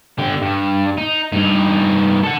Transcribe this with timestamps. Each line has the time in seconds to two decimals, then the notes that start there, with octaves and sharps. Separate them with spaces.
0.19 D3 G4
0.42 G2
0.98 D#4
1.32 G2 D#4
2.23 A4 F#5